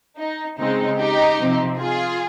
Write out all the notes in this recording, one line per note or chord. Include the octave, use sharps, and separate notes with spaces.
D#4
C#3 G#3 C4 D#4
D#4 G4
C3 F3 C4
F4 G#4